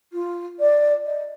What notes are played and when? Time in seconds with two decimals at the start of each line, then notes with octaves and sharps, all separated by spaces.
0.12 F4
0.59 D5
1.06 D#5